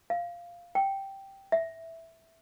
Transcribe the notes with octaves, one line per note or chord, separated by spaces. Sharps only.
F5
G5
E5